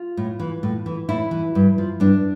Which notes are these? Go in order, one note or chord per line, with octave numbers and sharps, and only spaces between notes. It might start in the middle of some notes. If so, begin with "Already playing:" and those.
Already playing: F4
A2
E3
A2
E3
A2 E4
E3
G2
F3
G2 D4